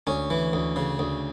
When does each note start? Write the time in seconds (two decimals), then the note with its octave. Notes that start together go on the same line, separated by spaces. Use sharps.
0.07 D2 C#4
0.30 E3
0.53 D2
0.76 C#3
0.99 D2